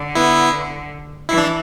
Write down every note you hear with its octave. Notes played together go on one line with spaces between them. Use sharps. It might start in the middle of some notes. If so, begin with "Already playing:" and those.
Already playing: D3
B3 E4
E3 E4
D4